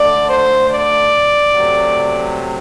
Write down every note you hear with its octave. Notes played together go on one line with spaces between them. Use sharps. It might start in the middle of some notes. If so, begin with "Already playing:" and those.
Already playing: D3 A3 D5
C5
D5
C3 F#3 A3